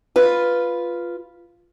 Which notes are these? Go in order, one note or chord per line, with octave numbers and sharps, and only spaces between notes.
F4 B4